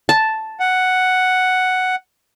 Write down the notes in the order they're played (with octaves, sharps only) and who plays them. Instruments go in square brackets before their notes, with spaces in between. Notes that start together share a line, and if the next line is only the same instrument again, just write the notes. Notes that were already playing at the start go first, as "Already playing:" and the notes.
[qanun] A5
[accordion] F#5